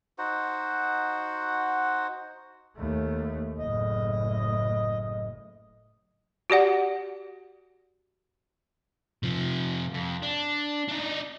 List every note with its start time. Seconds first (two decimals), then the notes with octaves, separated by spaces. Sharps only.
0.19 D#4 F#4 C5 F#5
2.77 D#2 A3
3.59 F#1 A2 D#5
6.50 F#4 G4 D5 F#5
9.23 C3 F3
9.95 F2
10.23 D4
10.88 D4 D#4